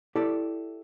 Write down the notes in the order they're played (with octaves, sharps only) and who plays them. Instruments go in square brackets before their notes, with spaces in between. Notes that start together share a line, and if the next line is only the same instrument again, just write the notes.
[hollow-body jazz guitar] E4 G4 A4 D5